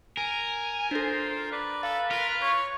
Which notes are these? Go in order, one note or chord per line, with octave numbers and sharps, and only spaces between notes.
A#4 G#5
D4 F4 A4 C5
B4 D5
A4 F5
F4 A#4 F6 B6
C#5 C#6